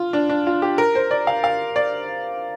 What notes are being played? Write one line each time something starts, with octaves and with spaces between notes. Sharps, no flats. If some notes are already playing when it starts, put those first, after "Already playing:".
Already playing: F4
D4
D4
F4
G4
A#4
C5
D5
F5
F5
D5